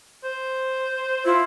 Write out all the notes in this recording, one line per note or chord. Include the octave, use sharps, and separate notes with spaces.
C5
E4 F4